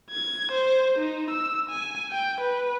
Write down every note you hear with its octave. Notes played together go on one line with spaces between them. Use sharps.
G#6
C5
D#4
E6
G#5
G5
B4